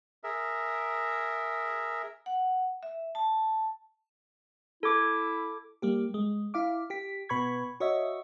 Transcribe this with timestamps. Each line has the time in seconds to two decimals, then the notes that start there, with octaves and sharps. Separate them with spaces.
0.24 G#4 A#4 E5
2.26 F#5
2.83 E5
3.15 A5
4.83 E4 A4 D6
5.82 G3 A#3 G4
6.14 G#3
6.54 E4 F5 D6
6.90 G4 B6
7.29 B2 B4 B5 C#6 G#6
7.80 F#4 C#5 D#5 E5